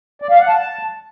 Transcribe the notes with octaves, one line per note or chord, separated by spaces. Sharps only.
D5
F5
F#5
A5